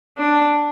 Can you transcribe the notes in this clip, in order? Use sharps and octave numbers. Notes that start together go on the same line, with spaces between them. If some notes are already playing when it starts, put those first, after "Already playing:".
D4